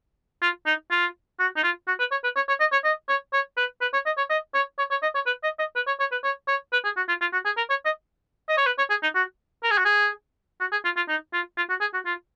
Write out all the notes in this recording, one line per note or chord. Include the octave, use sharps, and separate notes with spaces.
F4
D#4
F4
F#4
D#4
F4
F#4
B4
C#5
B4
C#5
C#5
D#5
C#5
D#5
C#5
C#5
B4
B4
C#5
D#5
C#5
D#5
C#5
C#5
C#5
D#5
C#5
B4
D#5
D#5
B4
C#5
C#5
B4
C#5
C#5
B4
G#4
F#4
F4
F4
F#4
G#4
A#4
C#5
D#5
D#5
C#5
B4
C#5
G#4
D#4
F#4
A#4
G#4
F#4
G#4
F#4
G#4
F4
F4
D#4
F4
F4
F#4
G#4
F#4
F4